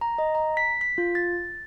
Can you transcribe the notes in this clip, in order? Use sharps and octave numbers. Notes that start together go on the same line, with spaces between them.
A#5
D#5
A#5
B6
B6
F4
A6